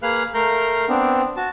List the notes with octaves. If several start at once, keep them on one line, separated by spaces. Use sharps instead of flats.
A#3 G#4 B4 F5 F6 F#6
A3 A#4 F5 A#5 G6
B3 C4 D4
F#4 A5